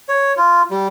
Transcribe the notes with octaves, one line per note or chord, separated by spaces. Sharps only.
C#5
F4
G3